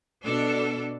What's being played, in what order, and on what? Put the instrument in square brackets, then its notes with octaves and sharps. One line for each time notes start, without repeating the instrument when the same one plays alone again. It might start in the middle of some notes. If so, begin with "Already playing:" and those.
[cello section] B2 D4 A4